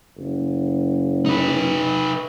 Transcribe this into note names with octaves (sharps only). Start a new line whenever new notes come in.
F#1
D#4 B4